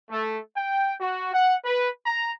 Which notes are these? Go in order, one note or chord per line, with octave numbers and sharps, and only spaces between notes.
A3
G5
F#4
F#5
B4
A#5